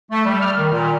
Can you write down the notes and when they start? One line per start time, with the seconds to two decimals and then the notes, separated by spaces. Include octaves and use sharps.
0.11 A3
0.26 G3
0.42 F6
0.58 D#3
0.73 A#2